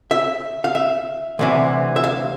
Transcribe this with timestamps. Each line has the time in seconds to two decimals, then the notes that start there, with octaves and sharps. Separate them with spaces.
0.11 E5
0.64 F5
0.75 E5
1.39 D2 C3 E3
1.96 E5
2.04 F5